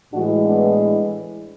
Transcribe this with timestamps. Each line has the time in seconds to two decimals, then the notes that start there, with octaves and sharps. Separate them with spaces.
0.12 A2 E3 G#3 D4 F#4
0.44 B3 D4